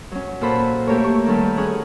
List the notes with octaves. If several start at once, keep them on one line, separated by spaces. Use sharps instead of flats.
F#3 C#4
A#2 F#4 A4 C5 B5
A3 A#3 G4 A4 A#4 C#5
C#6
D#3 F#3 G3 G4 A4 B4
C#4 G#4 C#5 F#6